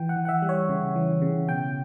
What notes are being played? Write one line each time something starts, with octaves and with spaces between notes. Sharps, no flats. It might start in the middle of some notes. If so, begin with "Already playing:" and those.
Already playing: E3 G5
F#5
E3
F#5
E5
G3
C#5
C#3
E3
C#3
B2 G5